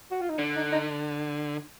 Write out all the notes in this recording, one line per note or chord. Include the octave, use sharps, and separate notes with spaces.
F#4
F4
D#4
D3 D4
D#4
D#4